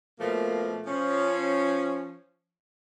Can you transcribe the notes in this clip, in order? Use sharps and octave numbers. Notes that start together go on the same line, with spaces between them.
B2 F3 A3 A#3
F3 C#4